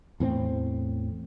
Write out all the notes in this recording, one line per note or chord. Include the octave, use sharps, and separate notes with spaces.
E2 A2 C4